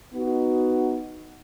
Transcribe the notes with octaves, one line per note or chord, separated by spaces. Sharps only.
B3 D#4 F#4